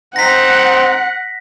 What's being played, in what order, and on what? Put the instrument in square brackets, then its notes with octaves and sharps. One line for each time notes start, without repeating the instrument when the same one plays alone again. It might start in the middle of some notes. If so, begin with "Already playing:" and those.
[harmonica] C4 D#4 [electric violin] F#5 [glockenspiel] A#6 B6